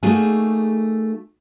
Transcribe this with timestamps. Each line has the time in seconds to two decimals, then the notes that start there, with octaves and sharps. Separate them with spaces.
0.03 A3 A#3 D#4 F#4 G#4